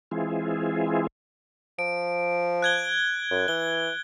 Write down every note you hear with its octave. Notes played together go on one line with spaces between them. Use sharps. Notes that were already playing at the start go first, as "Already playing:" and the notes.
E3 G#3 C4 E4 F4 G#4
F3 D7
F#6 G#6 G7
F#2
E3 G7